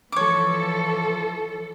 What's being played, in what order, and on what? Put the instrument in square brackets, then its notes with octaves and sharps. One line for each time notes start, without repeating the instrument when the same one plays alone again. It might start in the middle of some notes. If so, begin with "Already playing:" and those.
[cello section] E3 F3 A4 [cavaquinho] C#5 D6